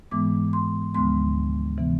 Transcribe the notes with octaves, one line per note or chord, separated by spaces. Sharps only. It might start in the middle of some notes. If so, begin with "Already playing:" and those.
G#2 E3 G#3 B3 D6
C6
D2 D3 F3 G#3 B3 C6
C3 E3 B3